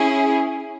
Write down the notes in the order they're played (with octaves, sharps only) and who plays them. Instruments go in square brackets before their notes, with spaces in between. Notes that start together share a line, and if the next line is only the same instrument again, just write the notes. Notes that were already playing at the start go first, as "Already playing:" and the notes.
Already playing: [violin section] C#4 E4 G#4